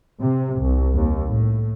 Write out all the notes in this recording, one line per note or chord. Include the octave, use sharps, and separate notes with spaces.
C3
C2
D#2
A2